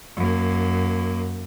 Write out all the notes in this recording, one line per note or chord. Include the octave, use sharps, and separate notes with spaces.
F#2 A#3